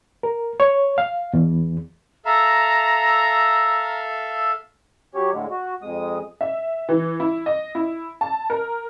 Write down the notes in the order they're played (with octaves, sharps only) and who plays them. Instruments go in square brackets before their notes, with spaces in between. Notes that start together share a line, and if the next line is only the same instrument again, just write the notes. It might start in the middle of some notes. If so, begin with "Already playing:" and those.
[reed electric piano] A#4
C#5
F5
E2
[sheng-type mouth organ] A4 E5 F5 [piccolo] A#5
[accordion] F#3 C#4 G4 C#5
A2 D3 G#3
F#4
F2 G#3 D#6
[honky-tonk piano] E5
E3
E4
D#5
E4
A5
A#4